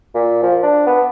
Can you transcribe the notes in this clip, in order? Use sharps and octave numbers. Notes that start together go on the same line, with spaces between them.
A#2
F3
D4
B3